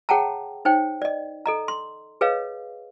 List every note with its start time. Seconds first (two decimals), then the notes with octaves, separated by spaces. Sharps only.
0.09 G#4 C#5 F#5 G5 A5 A#5
0.65 D#4 C5 C#5 G5
1.02 D5 D#5
1.46 A4 D#5 A#5
1.68 C6
2.21 G#4 B4 C#5 D#5 F5